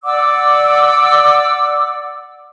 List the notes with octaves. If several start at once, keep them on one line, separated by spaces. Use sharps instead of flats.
D5 F#5 D6 E6